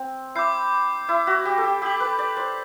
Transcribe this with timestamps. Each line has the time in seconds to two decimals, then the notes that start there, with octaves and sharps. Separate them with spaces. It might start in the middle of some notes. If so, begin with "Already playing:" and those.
Already playing: C4
0.35 E4 D6 G6 C7
1.09 E4
1.27 F#4
1.45 G4
1.58 A4
1.64 G4
1.82 G4 E6 G6 B6 F#7
2.00 B4
2.19 D5
2.37 C5